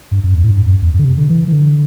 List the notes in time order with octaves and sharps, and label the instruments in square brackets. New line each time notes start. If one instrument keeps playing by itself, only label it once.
[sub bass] G2
F#2
E2
A2
G2
F#2
E2
F#2
D3
C3
D3
E3
E3
D3